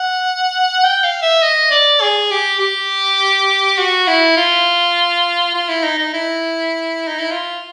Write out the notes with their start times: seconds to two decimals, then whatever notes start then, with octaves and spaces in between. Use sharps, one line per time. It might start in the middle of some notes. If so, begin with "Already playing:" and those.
Already playing: F#5
0.84 G5
1.03 F5
1.22 E5
1.42 D#5
1.71 D5
2.01 G#4
2.31 G4
2.60 G4
3.78 F#4
4.07 E4
4.36 F4
5.55 F4
5.69 E4
5.83 D#4
5.98 D#4
6.13 E4
7.07 D#4
7.19 E4
7.31 F4